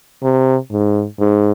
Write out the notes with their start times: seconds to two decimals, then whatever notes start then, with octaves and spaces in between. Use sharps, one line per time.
0.23 C3
0.71 G#2
1.19 G#2